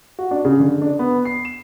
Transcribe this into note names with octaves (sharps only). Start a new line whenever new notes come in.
F#4
D4
C#3
D3
D4
B3
C7
E7